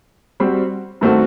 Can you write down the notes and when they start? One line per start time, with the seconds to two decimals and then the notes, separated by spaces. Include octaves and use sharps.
0.40 G3 C4 F#4 C5
1.01 G2 D#3 A3 C4 F#4